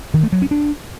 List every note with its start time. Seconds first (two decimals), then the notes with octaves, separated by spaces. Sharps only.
0.14 D#3
0.23 A3
0.32 F#3
0.42 C#4
0.51 D4